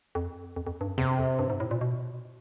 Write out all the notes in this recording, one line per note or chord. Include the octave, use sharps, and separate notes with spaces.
F2
F2
F2
G2
F#2
E2 C3
F2
G2
G#2
A2
A#2
B2